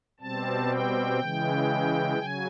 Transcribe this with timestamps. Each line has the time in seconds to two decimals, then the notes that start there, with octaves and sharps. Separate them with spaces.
0.20 B2 G3 C4 A5
0.69 G5
1.20 C#3 E3 G#3
2.18 C#3 F#3 G#5